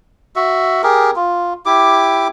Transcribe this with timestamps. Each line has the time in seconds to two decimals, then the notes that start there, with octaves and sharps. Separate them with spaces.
0.36 F#4 E5
0.83 G4 G#4 A#4
1.16 F4
1.66 E4 G4 D6